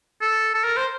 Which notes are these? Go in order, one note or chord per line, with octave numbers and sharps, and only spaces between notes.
A4
A4
A#4
C5